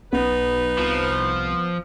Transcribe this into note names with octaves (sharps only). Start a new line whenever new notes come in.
B1 B3 D#4 B4
C2 F3